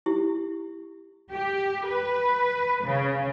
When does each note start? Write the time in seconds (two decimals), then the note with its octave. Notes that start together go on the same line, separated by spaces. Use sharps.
0.06 E4 G4
1.32 G4
1.87 B4
2.84 C#3